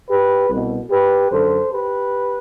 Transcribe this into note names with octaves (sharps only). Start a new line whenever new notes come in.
G4 B4
C2 B2
G4 B4
F#2 D3 A4 C5
G4 B4